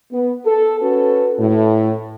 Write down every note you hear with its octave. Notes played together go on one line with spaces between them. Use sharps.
B3
A4
C#4 F#4 A4 B4
A2